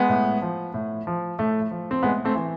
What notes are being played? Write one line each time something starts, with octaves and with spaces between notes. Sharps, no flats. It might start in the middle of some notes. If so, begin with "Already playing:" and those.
Already playing: G#3 B3
A2
F3
A2
F3
A2 A3
F3
C4
A2 G#3 B3
A3 C4
E3